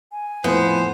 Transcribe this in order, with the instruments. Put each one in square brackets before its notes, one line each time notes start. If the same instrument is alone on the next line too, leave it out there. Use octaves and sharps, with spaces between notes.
[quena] G#5
[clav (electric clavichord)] F2 A2 F3 [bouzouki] B3 [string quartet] C5